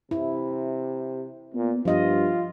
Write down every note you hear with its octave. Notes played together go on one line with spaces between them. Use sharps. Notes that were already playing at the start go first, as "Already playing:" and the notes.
C3 E4
A#2 B3
G2 F3 F4 D#5